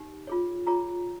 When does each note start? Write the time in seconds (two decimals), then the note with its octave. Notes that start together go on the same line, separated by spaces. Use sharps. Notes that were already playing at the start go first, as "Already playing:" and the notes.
Already playing: D#4 G4
0.27 F4 G#4 C#5
0.67 F4 G#4 C#5 A#5